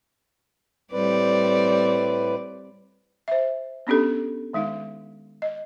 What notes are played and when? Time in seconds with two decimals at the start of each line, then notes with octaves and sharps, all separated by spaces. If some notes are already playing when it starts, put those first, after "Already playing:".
0.93 A2 G3 C4 B4 D5
3.28 C5 E5
3.87 B3 C#4 D4 G4 A4
4.53 D#3 G#3 D#4 F5
5.42 D#5